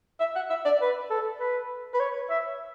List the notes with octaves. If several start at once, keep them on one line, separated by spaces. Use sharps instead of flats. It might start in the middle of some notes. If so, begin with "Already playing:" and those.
E5
F#5
E5
D5
B4
A4
B4
B4
C#5
E5